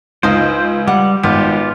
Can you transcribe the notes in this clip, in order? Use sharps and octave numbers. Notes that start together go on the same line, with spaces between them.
C#2 D#4 F4 C5
G3 F#5
G#1 B3 F4 G4